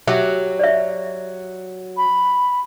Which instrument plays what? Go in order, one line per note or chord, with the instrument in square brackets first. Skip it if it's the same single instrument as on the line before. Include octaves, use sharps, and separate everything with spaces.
[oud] F#3 G4 [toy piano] E5
[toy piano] D5 E5
[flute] B5